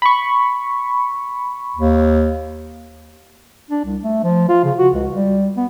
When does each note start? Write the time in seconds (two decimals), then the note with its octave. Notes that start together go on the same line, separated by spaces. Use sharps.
0.02 B5 C#6
1.77 D#2
3.71 D4
3.84 C2
4.03 A3
4.23 F3
4.49 F4
4.64 C#3
4.78 F#4
4.94 C#2
5.12 G3
5.57 B3